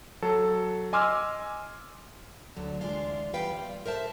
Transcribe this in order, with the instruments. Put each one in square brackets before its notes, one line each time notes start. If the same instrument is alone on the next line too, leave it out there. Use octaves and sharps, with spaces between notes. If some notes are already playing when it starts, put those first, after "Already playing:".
[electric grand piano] F#3 A4
D#5 G#5 C6 D6 E6 F6
[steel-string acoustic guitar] D2 D3 F#3
D2 E3 G#3 D4 F4 F5
E3 G3 B3 B4 F5 G5
G3 F4
A#4 C5 E5 A5